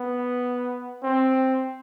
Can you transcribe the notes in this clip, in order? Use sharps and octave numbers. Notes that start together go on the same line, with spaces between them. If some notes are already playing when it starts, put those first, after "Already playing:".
Already playing: B3
C4